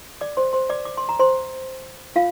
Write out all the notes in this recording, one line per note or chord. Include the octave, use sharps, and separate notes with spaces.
D5 D6
C5 C6
C5 C6
D5 D6
D6
C6
A#5
C5 C6
F4 F5